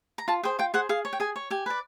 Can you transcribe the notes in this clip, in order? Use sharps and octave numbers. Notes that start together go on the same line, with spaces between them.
A#5
F4 A5
G#4 C5 G5
F4 G5
G#4 C5 F#5
G#4 F5
C#5
G5
G#4 G#5
C#5
G4 G#5
B4 D5